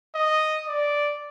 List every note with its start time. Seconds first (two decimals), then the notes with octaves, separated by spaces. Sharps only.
0.16 D#5
0.68 D5